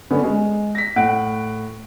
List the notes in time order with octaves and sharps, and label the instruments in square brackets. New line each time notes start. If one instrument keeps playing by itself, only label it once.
[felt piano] D3 A3 B3 C#4
G#3
A#6 B6
A2 F#5 F#6 D7